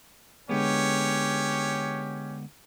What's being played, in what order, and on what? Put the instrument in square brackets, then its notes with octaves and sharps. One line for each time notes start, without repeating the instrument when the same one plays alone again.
[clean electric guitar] D3 G#3 B3 [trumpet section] C#4 G4 C#5